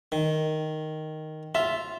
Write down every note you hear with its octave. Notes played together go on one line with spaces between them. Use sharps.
D#3
F4 E5